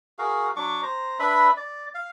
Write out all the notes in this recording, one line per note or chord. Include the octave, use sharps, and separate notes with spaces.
F#4 G#4 A#4 F5
F#3 D4 C#6 D6
C5 A#5
D4 B4 E5 B5
D5
F5